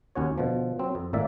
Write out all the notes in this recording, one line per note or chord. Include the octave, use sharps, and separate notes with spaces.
D#2 C#4 F#4 C#5
B2 D3 F3
F#3 C4
F2
G#1 A2 A#3 D5 E5